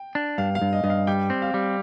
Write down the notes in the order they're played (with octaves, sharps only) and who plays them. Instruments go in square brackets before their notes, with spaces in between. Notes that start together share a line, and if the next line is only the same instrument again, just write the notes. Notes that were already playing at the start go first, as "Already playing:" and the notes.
Already playing: [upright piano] G5
[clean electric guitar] D4
[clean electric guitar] G2 [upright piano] F5
[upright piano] F5
[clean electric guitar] G2
[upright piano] D#5
[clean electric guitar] G2 [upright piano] D#5
[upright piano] F5
[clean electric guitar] G3 [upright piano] G5
[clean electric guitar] C4
[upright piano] F5
[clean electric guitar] G3